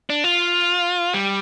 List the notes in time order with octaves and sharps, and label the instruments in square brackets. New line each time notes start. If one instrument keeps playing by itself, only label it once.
[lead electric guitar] D4
F4
G3